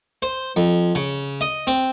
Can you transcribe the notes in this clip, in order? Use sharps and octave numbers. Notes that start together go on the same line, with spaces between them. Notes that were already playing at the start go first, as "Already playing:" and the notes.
C5
F2
C#3
D#5
C4